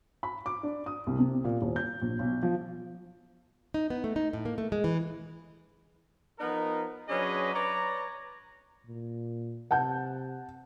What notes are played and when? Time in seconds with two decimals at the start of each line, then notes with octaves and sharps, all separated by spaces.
0.23 B5
0.46 D6
0.63 D4
0.86 D#6
1.07 C2
1.19 C3
1.44 A#2
1.62 D#1
1.76 G6
2.02 A#1
2.19 B1
2.43 F3
3.74 D#4
3.90 B3
4.04 A3
4.16 D#4
4.33 A2
4.45 A#3
4.58 A3
4.72 G#3
4.84 E3
6.39 F3 B3 D#4 A#4
7.09 F#3 C#4 D4 G#4 B4 D#5
7.54 B4 C#5 D5 A#5
8.86 A#2
9.71 C3 F#5 A5 G6